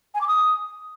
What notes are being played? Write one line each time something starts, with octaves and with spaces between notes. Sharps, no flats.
G#5
D6
D#6